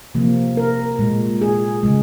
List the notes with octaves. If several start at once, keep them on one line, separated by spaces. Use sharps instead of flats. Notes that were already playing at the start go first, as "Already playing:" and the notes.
C3 F3 A#3
A#4
A#2 G#3
G#4
C#3 G#3